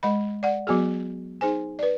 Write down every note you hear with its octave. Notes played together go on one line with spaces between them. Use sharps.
G#3 D#5 B5
D5 F#5
F#3 B3 F#4 G#4
D#4 G#4 C5 G#5
B4 D5